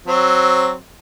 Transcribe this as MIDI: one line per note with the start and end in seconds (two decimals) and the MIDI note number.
0.07 0.73 54
0.07 0.73 60